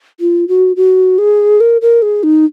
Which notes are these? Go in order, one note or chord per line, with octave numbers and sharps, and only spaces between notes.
F4
F#4
F#4
G#4
A#4
A#4
G#4
D#4